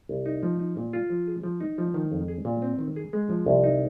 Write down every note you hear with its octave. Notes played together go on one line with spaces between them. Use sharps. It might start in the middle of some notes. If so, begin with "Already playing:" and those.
C2
D#4
F3
D#4
A#2
F4
F3
G#4
F3
D#4
F3
D#3
F2
G#4
A#2
C4
D#3
G#4
G#3
F3
C2
D#4